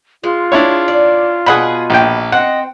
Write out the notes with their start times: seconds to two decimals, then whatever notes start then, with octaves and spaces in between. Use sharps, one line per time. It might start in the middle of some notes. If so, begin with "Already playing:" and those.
0.24 G#3 F4
0.52 D4 E4 C#5
0.88 D5
1.46 B2 G#4 D#5 F#5 B5
1.90 A#1 G5
2.32 C4 D#5 F#5